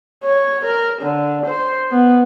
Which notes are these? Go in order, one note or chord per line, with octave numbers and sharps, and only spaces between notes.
C#5
A#4
D3
C5
B3